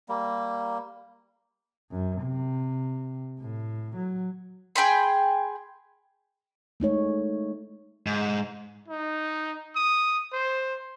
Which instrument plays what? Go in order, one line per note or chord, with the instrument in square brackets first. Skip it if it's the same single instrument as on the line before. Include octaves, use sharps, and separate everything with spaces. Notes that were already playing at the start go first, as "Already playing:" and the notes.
[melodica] G3 A#3
[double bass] F#2
C3
A2
F#3
[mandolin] G#4 G5 B5 C6
[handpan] G#3 A3 D#4 C#5
[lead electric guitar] G#2
[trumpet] D#4
D#6
C5